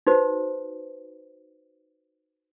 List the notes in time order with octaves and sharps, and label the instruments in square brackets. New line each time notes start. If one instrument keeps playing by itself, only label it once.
[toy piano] D#4 F#4 B4 C5